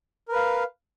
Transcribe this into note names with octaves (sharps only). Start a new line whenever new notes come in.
A#4 B4 F5